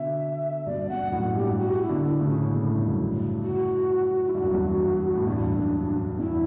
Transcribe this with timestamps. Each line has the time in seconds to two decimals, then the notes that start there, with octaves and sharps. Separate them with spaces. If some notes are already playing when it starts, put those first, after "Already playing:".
Already playing: B2 D3 E5
0.66 G2 B2 D5
0.89 G2 B2 F#5
1.12 F#2 A2 F#5
1.35 G2 B2 G4
1.59 F#4
1.82 E4
1.89 B2 D3
2.05 D4
2.20 A2 C#3
2.28 C#4
2.51 B2
2.63 A2
2.74 G2
2.86 F#2 A2
3.43 F#4
4.27 E4
4.35 G2 F#4
4.44 F#2
4.53 E2 G2
5.16 A2
5.27 E2 G2 D4
5.58 F#2
5.88 F#2
6.18 E2 E4